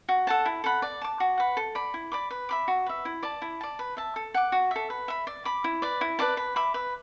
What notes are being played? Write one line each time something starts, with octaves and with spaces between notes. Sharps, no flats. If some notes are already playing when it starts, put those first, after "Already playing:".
F#4
A4 F#5 A5
E4
A4 F#5 B5
D5
A5 D6
F#4
B4 F#5
A4
D5 B5
E4
D5 B5 D6
B4
E5 B5 D6
F#4
B4 E5
E4
D5 A5
E4
D5 A5
B4
E5 A5
A4
F#5 D6
F#4
A4 E5
B4
E5 B5
D5
B5 D6
E4
B4 D5
E4
B4 D5 A5
B4
E5 B5 D6
B4